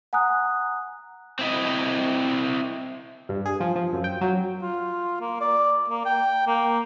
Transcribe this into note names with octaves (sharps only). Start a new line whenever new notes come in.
F#5 G#5 A#5 D#6 F#6
C4 E4 D#5
G2
G#4
F3
F3
F#2
G5
F#3
F4
A#3
D5
A#3
G5
A#3